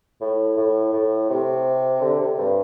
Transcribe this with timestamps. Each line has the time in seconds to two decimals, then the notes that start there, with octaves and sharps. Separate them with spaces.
0.20 A2
0.57 A2
0.93 A2
1.30 C3
2.01 D3
2.20 C3
2.38 G2